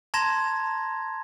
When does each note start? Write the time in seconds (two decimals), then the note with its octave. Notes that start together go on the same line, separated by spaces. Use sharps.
0.14 A5 A#5 C6 G#6 A#6 E7